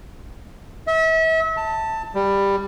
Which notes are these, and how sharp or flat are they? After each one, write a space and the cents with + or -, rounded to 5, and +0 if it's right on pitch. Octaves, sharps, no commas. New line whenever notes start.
E5 -35
A5 +15
G3 +15